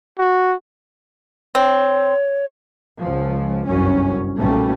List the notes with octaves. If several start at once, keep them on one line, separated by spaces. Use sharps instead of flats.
F#4
C4 C#5
C#2 F3
G1 C2 F#2 C#4
B1 A#2 G3 A3 C#4